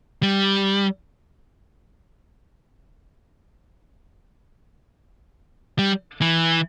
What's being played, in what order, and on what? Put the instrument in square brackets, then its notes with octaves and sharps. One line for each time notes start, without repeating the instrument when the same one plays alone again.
[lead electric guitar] G3
G3
E3